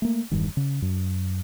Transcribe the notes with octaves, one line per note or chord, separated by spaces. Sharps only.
A3 A#3
E1 G2 D#3
C#3
F#2